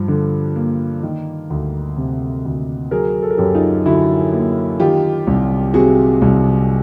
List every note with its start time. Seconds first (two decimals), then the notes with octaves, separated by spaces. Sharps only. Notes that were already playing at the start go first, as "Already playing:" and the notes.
Already playing: G2 F3
0.08 D3
0.56 A#3
1.03 D#3
1.50 D2
1.97 C3
2.45 D2
2.91 F#3 G#4 A#4
3.22 A4
3.30 A#4
3.37 F#2 G4 A4
3.55 D#4 F4
3.86 D3 E4 F#4
4.33 A#3
4.80 D#3 F4 G4
5.27 C2
5.74 C3 F#4 G#4
6.22 C2